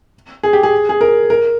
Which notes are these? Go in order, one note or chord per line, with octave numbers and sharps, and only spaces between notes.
G#4
G4
G#4
G#4
A#4
A#4